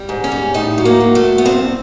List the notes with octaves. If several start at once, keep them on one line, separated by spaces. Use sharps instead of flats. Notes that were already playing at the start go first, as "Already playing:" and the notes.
Already playing: G3
G#2
C#4
G3
A2 D#4
F#3
A#3
F#3
A3
A2
B3
G2 C4